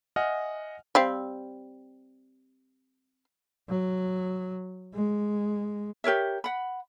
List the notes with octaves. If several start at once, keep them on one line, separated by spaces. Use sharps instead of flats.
D#5 E5 F#5 G#5 F6
G3 C4 F5
F#3
G#3
G4 A#4 C#5 E5
F#5 B5